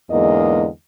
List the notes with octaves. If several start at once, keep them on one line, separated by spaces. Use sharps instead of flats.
E2 G#2 D3 G#3 A#3 D#5